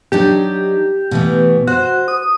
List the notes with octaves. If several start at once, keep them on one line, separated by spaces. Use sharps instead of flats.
F#3 D4 D#4 G4
B2 E3 A3
F#4 C5
D#6